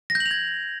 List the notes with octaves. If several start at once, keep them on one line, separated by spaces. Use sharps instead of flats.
A#6
G6
F#7
F7
G#6